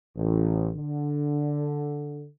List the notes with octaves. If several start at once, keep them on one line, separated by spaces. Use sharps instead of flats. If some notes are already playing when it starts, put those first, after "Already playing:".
A1
D3